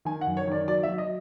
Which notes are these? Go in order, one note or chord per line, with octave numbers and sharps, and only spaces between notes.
D#3 G#5
F#5
F#2
C#5
D#3 D5
F#3 D5
E5
F#3
D#5